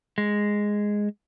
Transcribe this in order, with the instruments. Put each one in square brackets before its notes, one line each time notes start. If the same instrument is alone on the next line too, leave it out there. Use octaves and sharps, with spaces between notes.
[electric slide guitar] G#3